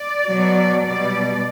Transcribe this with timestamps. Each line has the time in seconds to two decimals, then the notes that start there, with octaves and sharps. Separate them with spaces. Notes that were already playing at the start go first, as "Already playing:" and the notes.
Already playing: D5
0.27 B2 F#3
0.85 B2 G3 D5